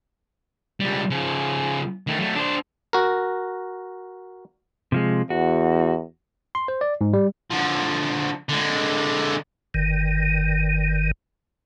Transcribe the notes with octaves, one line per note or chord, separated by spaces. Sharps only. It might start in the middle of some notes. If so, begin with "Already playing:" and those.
C#2 G3
C#3 F3
D#3 A3
F#3 A3
D4 C5
F#4 A#4
C3 F3 G#3
E2 F#4
C6
C5
D5
G#2
G3
D3 F3
D3 G#3
G1 D#3